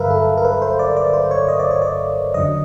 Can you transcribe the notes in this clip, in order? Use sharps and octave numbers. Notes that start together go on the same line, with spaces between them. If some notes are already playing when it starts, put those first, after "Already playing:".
Already playing: G2 D3 F#3 A#4 B4 E5 F5
A4
A#4
B4
C5
D5
D5
C5
C#5
D#5
D5
C#5
D5
F#2 D3 F#3 D#5